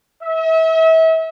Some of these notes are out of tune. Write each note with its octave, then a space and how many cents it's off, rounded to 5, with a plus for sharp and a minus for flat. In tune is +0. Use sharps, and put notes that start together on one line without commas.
E5 -35